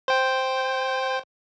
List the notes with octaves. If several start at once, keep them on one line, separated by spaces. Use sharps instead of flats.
C5 G5